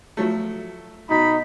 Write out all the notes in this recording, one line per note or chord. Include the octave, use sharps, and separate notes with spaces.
F3 F#3 A3
B2 D#4 B5